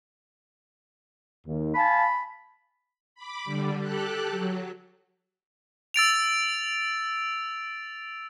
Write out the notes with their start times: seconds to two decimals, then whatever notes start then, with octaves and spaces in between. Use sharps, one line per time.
1.46 D#2
1.75 F5 G#5 A5 B5
3.15 B5 D6
3.44 D3 G3
3.80 G4 A4 F#6
4.29 F#3
5.94 E6 A6 D7 F7